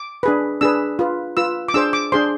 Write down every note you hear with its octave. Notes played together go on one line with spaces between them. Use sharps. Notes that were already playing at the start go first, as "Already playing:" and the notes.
Already playing: D6
D4 G#4 B4
D4 G#4 B4 E6
F4 B4
F4 B4 E6
D6
D4 G#4 C5 E6
D6
D4 G#4 C5 C6